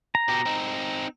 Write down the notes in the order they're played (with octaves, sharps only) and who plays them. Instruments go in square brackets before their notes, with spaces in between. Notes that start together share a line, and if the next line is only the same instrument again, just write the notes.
[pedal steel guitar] A#5
[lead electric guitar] B2 G4
C4 D#4